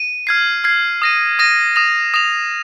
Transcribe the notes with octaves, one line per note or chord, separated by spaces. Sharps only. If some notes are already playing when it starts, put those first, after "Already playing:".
Already playing: D#7
F6 G#6 C7
F6 G#6 C7
D#6 A#6 D#7
D#6 A#6 D#7
D#6 A#6 F7
D#6 A#6 F7